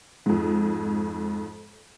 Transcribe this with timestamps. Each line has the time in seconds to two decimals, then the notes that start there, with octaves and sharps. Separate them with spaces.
0.26 F2 G#2